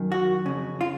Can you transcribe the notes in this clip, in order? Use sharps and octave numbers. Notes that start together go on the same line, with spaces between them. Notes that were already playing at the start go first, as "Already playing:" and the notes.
Already playing: F#2 D#3
F#4
F2 C#3
F4